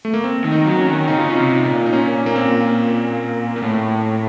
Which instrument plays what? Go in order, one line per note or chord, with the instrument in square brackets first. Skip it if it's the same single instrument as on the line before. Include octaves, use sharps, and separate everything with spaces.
[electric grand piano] A3
A#3
C4
[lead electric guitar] D#3
[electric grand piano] D#4
[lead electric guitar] F#3
[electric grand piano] C#4
[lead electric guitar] D#3
[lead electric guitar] C#3 [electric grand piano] D#4
[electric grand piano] F4
D#4
[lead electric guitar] C3 [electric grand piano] F4
[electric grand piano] D#4
[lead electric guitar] A#2
[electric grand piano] D#4
[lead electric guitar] A#2 [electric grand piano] C#4
[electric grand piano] A#3
C4
[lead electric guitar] A#2
A2